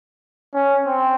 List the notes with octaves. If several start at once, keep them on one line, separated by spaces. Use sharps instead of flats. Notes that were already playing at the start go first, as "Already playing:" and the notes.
C#4
C4